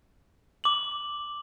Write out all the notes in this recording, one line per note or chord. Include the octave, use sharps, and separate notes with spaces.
D6 F#7